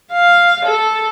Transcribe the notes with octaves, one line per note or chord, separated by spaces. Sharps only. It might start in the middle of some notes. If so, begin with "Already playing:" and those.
F5
A4